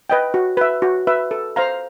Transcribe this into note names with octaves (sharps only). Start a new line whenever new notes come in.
B4 D#5 G5
F#4
B4 E5
F#4
B4 E5
A4
C5 F5 A#5